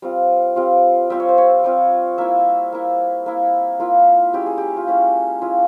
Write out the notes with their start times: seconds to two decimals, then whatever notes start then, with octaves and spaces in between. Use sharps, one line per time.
0.02 G3 C4 F4
0.56 G3 C4 F4
1.10 G3 C4 F4 E5
1.20 C#5
1.29 C5
1.38 C#5
1.64 G3 C4 F4
2.18 A#3 E4 E5
2.72 A#3 E4
3.26 A#3 E4
3.80 A#3 E4 F4
4.33 G#3 C#4 E4 G4
4.46 G#4
4.58 G4
4.77 F4
4.87 G#3 C#4 E4 G4
5.41 G#3 C#4 E4 F4